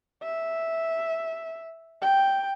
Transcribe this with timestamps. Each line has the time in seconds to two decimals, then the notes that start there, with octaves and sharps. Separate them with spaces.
0.23 E5
2.02 G5